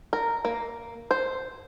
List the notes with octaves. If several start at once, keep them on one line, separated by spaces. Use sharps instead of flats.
A#4
A#3
C5